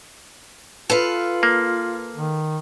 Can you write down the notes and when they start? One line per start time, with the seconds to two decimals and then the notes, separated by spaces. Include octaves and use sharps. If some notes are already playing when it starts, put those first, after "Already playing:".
0.90 F4 A4 B4 F5
1.43 A#3
2.16 D#3